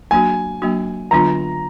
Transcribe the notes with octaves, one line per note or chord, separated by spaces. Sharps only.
F#3 A#3 D4 F#4 G#5
F#3 A#3 D4 F#4
D3 F#3 B3 D4 F4 A#5